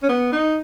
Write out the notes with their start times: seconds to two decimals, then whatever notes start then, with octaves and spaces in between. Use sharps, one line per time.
0.03 C#4
0.09 B3
0.32 D#4